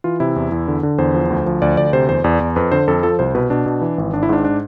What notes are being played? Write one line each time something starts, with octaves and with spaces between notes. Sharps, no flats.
E3 F4
C3 E4
E2
E2
D3
D3
E2 C5
F3
D2
F3
D2 D5
D2 D5
C3 C5
E2 C5
E2 D5
E2
F2 B4
D3 C5
F2 A4
F3 A4
C2 C5
B2 B4
B2 D4
B2
E3
G#1
G#1 D4
E4
G#2 D4
D4